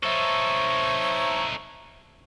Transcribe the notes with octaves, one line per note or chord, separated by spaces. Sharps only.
D#4 A4 C5 C#5 E5